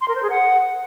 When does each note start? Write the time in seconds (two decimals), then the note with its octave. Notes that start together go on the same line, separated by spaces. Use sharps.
0.01 C6
0.08 A#4
0.15 C5
0.23 G#4
0.30 F#5